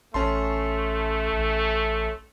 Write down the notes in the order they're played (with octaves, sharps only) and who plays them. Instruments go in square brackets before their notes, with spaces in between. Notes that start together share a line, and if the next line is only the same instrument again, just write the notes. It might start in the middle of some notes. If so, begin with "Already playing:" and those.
[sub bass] A1 [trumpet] A3 [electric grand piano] C#4 A5 C6
[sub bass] A1